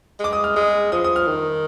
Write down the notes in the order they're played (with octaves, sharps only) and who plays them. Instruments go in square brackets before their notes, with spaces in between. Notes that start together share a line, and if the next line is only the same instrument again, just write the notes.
[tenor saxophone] G#3 [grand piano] D6
[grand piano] D#6
F6
[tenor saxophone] G#3 [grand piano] D#6
[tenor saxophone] F3 [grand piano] D#6
[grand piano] D#6
F6
[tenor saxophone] D#3